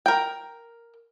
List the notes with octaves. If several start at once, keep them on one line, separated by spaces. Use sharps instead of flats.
A#4 G5